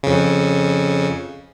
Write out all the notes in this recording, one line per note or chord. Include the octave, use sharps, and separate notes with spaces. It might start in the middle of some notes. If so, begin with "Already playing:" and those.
F2 C#3